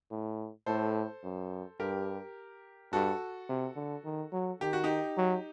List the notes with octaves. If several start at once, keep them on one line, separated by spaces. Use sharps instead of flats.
A2
A2 A4 C5
F#2
G2 G4 A#4
G2 F#4 A4
C3
D3
D#3
F#3
D#3 G4
F#4
D#4 G4
F#3